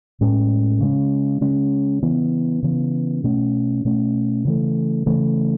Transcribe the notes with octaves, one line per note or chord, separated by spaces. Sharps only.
A2 G#3 C#4
C#3 G#3 C#4
C#3 G#3 C#4
C#3 E3 B3
C#3 E3 B3
B2 A3 C#4
B2 A3 C#4
C#3 E3 A3
C#3 E3 A3